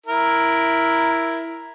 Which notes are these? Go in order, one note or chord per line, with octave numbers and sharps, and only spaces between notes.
E4 A#4